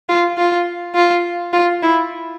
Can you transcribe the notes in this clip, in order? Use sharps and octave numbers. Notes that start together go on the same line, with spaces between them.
F4
F4
F4
F4
E4